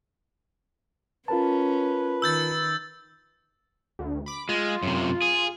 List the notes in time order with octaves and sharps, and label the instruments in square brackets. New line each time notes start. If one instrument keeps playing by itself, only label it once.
[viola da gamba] C#4 [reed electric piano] F4 A#4 A5 [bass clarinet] B4
[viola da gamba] D#3 [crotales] E6 G6 A6
[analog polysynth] D2
B5 D6
[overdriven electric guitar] G#3 [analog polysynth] F4
[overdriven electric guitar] F#2 C3
G#4